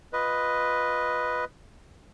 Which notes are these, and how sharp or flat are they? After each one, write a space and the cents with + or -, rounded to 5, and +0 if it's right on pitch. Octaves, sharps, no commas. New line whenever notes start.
F4 +15 B4 +0 D#5 +0